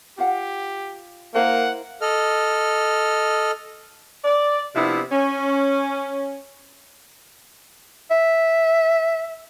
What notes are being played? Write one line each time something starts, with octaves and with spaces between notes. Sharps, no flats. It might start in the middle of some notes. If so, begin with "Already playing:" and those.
F4 G4 F5 F#5
A#3 E4 A#4 C5 F#5
A4 D#5 F6
D5
C3 F3 B3 D4 E4
C#4
E5